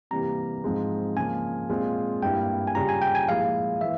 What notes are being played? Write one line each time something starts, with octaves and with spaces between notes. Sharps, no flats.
C3 E3 G3 A#3 A#5
G#2 F3 G#3 C4
C#3 F3 A#3 G#5
A#2 G#3 C4 F4
G2 G3 A#3 E4 G5
G#5
C#3 G3 C#4 F4 A#5
G#5
G5
G#5
A#2 F3 G#3 E4 F5
E3 A#3 E5